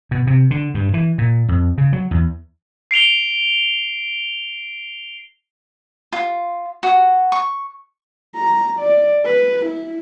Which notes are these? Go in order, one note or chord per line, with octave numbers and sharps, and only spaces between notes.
B2
C3
D3
G2
E3
A#2
F2
C#3
F#3
E2
C7 D7 F7 G7
F4
F#4
C#6
A#5
D5
B4
E4